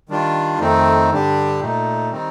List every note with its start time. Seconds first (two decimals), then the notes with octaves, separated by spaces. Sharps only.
0.09 D#3 G3 D4 F4
0.59 F2 D#3 A3 C4 D#4
1.10 G2 D3 G3 D4 G4
1.60 A#2 A3 D#4
2.11 D#3 G3 C4 D#4